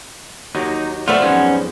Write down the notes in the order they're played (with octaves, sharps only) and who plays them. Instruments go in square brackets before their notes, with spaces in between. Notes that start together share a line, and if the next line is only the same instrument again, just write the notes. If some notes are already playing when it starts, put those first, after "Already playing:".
[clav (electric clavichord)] D#2 F#3 [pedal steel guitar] D#4
[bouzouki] G3 F#4 C5 [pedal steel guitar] A3 F4 [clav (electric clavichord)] B3 E5
[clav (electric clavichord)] F2 G#2 B3 [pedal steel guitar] F#3 C#4